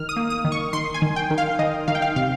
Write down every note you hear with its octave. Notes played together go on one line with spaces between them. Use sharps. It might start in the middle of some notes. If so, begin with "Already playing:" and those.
Already playing: D#3 F6
D#6
A#3
D#6
D#3
C#6
D#3 C6
G#5
D#3
G5
D#3
F5
D#3 D#5
D#3 F5
G5
F5
C3 F5